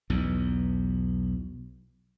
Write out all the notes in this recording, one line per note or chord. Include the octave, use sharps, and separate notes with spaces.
B1 E2